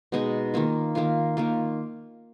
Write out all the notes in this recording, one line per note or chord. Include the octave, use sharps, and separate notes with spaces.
B2 G#3 D#4
D#3 A#3 F4
D#3 A#3 F4
D#3 A#3 F4